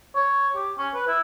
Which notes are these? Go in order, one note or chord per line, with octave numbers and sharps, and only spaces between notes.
C#5
G4
C#4
B4
E4